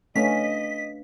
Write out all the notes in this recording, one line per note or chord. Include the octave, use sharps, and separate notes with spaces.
A3 C#4 D4 B4 D#5 F5 B6